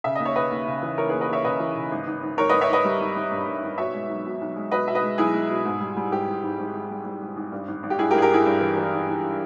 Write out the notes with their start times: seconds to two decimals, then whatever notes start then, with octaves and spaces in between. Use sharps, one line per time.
0.04 C#3 E5
0.15 D#2 D#5
0.25 C#5
0.35 C#3 B4 D#5
0.51 D#2
0.67 C#3
0.82 E3
0.98 E3 A#4 C#5
1.09 G#4 B4
1.14 D#2
1.21 B4 D#5
1.29 D#2 C#5 E5
1.44 C#3 B4 D#5
1.60 E3
1.75 C#3
1.91 G#1
2.06 G#1
2.22 G#1
2.38 G#1 A#4 C#5
2.49 B4 D#5
2.53 G#1
2.61 C#5 E5
2.69 G#1 B4 D#5
2.84 G3
3.00 G#1
3.16 G#1
3.32 G2
3.47 G2
3.63 G#1
3.78 B2 C#5 E5
3.94 G#3
4.09 B1
4.25 B2
4.41 B1
4.56 G#3
4.71 B2 B4 D#5
4.88 B2 E5
4.95 B4 D#5
5.03 G#3
5.18 B1 E4 G#4
5.34 G#3
5.49 B2
5.65 G#2
5.81 G3
5.97 G3
6.11 G#2 G4
6.28 G#1
6.43 G#1
6.59 G#1
6.74 G#1
6.90 G3
7.05 G3
7.21 G#1
7.36 G#1
7.52 G2
7.68 G#1
7.83 G#1
7.90 G4
7.99 G2 E4 G#4
8.11 G4 A#4
8.14 G2 G#4
8.22 G4 A#4
8.30 G#1 E4 G#4
8.46 G2
8.61 E3
8.77 E3
8.92 G#1
9.08 G#1